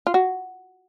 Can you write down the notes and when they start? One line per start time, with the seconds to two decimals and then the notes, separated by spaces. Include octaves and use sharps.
0.07 F4
0.14 F#4